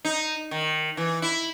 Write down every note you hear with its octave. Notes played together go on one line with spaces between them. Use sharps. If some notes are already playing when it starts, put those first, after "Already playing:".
D#4
D#3
E3
E4